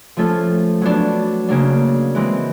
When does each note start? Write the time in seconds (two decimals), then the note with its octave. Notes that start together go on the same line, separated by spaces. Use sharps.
0.17 F3 A3 C#4 F4 A4
0.82 F#3 B3 D4
1.49 C#3 F#3 A#3 D4
2.15 E3 G#3 C4